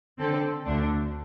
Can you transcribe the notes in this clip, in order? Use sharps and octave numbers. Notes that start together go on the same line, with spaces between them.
D3 C4 A4
D2 D3 A3 D4